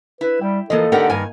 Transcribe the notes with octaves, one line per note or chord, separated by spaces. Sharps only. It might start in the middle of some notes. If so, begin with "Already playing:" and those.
E4 B4
G3 G5
A2 E3 F3 A#3 A4 D#5
D3 D#4 G4 A#4 B4 F#5
G2 D#3 G#5